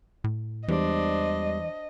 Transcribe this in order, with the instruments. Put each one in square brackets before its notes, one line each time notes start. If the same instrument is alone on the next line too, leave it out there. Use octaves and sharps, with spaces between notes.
[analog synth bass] A2
[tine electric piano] E2 G3 G#3 [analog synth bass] E3 [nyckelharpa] D4 C5 [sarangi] D#5